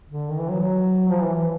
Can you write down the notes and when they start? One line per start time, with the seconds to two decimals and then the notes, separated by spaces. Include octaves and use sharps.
0.10 D3
0.29 D#3
0.39 E3
0.49 F#3
0.60 F#3
1.09 F3
1.22 E3
1.35 E3